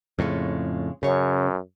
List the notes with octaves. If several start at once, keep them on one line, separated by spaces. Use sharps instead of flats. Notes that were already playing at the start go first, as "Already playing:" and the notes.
F2 A2 C#3 G#3 C#4
F#2 C#3 C#4 C#5